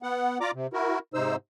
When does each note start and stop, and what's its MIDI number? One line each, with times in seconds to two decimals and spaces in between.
0.03 0.38 59
0.03 0.38 78
0.41 0.51 65
0.41 0.51 74
0.41 0.51 82
0.41 0.51 86
0.54 0.67 48
0.73 0.99 64
0.73 0.99 66
0.73 0.99 70
1.14 1.36 44
1.14 1.36 48
1.14 1.36 63
1.14 1.36 72
1.14 1.36 88